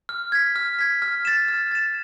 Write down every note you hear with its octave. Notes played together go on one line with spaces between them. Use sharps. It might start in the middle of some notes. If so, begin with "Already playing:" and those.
F6
G#6 B6
F6
G#6 B6
F6
A6 E7
F6
A6 E7